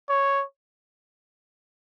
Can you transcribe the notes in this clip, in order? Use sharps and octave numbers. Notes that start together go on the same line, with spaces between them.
C#5